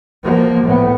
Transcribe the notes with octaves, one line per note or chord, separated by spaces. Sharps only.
F3 A#3
A2 B3